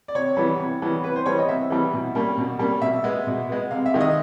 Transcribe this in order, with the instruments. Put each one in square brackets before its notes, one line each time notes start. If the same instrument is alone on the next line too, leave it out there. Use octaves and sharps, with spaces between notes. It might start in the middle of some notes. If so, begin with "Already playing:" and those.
[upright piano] D5
C3 C#5
E3 G3 B3
C3
E3 G3 B3
C3 B4
C5
E3 G3 B3 C#5
D#5
C3 E5
E3 G3 B3
B2
G3 A#3 C#4
B2
G3 A#3 C#4
B2 E5
G#3 B3
B2
G#3 B3
C3 F5
E5
D#3 G#3
D#5